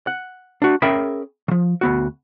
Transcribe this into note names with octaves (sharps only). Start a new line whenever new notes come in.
F#5
D4 F#4
C#4 G#4 A#4 E5 G5 B5
D#3 F3
D2 B3 F#4